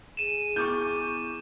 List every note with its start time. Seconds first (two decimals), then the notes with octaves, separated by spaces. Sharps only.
0.17 G#4 D#7 E7
0.56 B3 E4 C#6 D6 G6